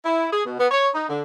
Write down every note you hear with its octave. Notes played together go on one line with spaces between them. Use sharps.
E4
G#4
B2
B3
C#5
D#4
D3